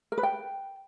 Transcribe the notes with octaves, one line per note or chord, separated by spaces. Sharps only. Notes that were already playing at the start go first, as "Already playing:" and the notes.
A#4
B4
G5